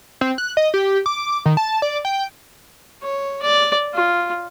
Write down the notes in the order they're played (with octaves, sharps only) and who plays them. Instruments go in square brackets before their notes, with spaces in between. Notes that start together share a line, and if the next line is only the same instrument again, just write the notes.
[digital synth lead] C4
F#6
D#5
G4
D6
D#3
A5
D5
G5
[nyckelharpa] C#5
D5
F4